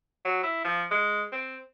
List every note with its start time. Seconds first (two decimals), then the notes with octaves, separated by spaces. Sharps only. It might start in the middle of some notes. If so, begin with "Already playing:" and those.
0.25 F#3
0.43 E4
0.64 F3
0.91 G#3
1.32 C4